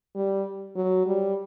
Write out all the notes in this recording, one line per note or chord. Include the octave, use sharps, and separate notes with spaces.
G3
F#3
G3